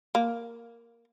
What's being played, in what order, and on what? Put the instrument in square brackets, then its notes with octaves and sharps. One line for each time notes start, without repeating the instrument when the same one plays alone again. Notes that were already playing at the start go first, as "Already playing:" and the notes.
[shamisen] A#3